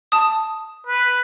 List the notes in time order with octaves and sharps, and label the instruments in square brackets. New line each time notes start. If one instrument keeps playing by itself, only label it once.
[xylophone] A5 D#6
[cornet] B4